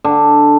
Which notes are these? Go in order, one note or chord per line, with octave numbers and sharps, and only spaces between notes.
D3